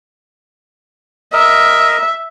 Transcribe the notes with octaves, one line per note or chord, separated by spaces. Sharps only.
A#4 D#5 E5